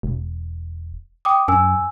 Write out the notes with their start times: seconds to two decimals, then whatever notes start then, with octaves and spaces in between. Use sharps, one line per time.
0.03 E1
1.25 G5 D6 D#6
1.48 F#2 G#5 E6